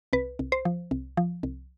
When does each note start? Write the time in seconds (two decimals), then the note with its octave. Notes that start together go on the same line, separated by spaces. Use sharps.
0.13 C2 B4
0.39 C2
0.52 C5
0.65 F3
0.91 C2
1.17 F3
1.43 C2